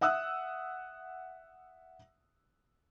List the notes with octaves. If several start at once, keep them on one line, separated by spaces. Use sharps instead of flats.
E5 F#5 D#6 E6 F#6